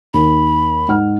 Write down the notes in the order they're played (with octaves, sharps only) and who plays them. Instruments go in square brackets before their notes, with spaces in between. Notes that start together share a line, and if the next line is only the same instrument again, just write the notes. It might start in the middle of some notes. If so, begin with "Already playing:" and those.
[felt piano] D#2 [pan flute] B5
[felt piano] G#2 F#5 F6